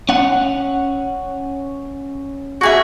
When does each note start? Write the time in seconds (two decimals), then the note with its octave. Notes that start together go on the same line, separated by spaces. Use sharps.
0.09 C#4 F#5
2.61 F#4 G#4 E5